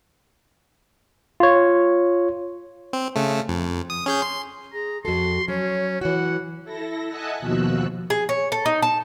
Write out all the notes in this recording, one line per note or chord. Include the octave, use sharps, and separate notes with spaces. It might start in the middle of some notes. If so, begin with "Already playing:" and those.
F4 C#5
C4
C#3 A3
F2
D#6
C#4 G#4 G6
C6
G#4 A#5
F2 F#4 A4 C6
F#3 C#4 C#5
E3 F#4 F#5
E4 A4 A#6
D#5 E5 F#5 G#5 A5 F#6
D#2 B2 F3 F#4 E6 F#6
G#4
C#5
A4
D#4
A5